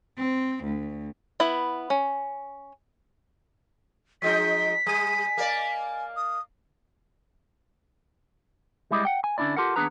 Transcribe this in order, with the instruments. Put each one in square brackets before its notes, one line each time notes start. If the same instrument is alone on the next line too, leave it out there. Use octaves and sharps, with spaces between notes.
[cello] C4
D2
[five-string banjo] B3 E4 E5
C#4
[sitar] F3 G#3 D#4 [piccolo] B6
[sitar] G3 [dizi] G#5
[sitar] A#3 D5
[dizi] D#6
[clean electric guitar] G3 G#3 E4 G4 G#4 D#5
F#5 G5
G#5
D3 C#4 D4 E4 D5
F4 G4 A4 A#4 F#5
D#2 B3 D4 G#4 B4 A#5